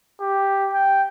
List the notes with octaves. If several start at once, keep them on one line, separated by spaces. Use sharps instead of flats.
G4
G5